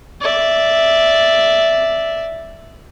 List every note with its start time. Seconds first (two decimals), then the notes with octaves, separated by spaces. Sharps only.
0.21 D5 E5